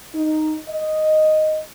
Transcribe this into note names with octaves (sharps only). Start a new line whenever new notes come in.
D#4
D#5